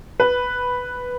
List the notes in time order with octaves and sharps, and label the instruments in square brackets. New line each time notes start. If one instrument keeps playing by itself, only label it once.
[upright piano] B4